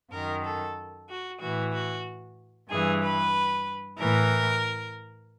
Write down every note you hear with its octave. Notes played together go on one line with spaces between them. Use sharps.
F#2 D#3 A#4
A4
F#4
A2 E3 F#4
F#4
G2 E3 G#4
B4
A2 E3 A#4